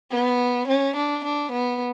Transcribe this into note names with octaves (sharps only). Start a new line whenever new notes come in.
B3
C#4
D4
D4
B3